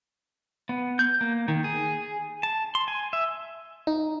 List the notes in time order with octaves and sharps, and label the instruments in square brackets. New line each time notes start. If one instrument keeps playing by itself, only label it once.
[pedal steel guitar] B3
G6
A#3
D#3
G#4
A5
C6
G#5
E5
[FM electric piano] D#4